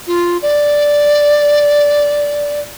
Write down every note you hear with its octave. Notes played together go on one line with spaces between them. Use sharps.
F4
D5